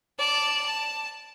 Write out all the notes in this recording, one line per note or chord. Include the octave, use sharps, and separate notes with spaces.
D5 A5
A5